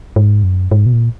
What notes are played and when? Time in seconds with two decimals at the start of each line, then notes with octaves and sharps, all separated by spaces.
0.16 G#2
0.43 F#2
0.71 G#2
0.86 B2
0.93 A#2